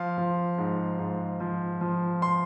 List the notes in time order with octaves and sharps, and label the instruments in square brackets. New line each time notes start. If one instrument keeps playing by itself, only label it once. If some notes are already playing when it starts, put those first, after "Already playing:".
Already playing: [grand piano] F3 F5
F3
G#2
G#2
F3
F3
C6